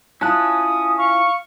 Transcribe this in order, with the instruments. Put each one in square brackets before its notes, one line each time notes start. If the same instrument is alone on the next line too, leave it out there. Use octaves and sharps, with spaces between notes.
[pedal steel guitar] C#4 A5 F#6 [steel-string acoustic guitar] E4 F4 [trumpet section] D#6
[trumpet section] F5 [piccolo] C#6